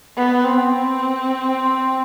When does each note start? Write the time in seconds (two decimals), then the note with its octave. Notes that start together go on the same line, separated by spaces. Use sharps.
0.16 B3
0.45 C4